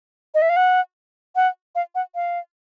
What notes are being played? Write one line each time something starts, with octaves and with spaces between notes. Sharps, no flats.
D#5
E5
F5
F#5
F#5
F5
F#5
F5